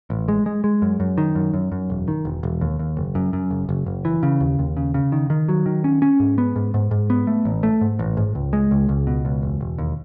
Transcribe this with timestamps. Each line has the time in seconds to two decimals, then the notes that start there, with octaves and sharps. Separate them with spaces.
0.10 A1
0.28 G#3
0.46 G#3
0.64 G#3
0.82 F#2
1.00 F#2
1.18 D#3
1.35 F#2
1.54 F#2
1.72 F#2
1.90 E1
2.08 D#3
2.25 E1
2.43 E1
2.61 D#2
2.79 D#2
2.97 F#1
3.15 F#2
3.33 F#2
3.51 F#1
3.69 F#1
3.86 F#1
4.05 E3
4.23 C#3
4.40 D#2
4.59 D#2
4.77 C#3
4.94 C#3
5.12 D#3
5.30 D#3
5.49 F#3
5.66 D#3
5.84 C#4
6.02 C#4
6.20 G#2
6.38 B3
6.56 G#2
6.74 G#2
6.91 G#2
7.10 B3
7.27 A3
7.45 A1
7.63 A3
7.81 G#2
7.99 A1
8.17 G#2
8.35 C#2
8.53 G#3
8.71 C#2
8.89 C#2
9.07 B2
9.25 C#2
9.43 E1
9.61 E1
9.78 D#2